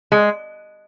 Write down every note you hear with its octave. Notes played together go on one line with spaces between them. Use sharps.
G#3